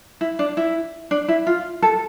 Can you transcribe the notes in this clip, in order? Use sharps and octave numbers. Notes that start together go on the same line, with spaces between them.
E4
D4
E4
D4
E4
F4
A4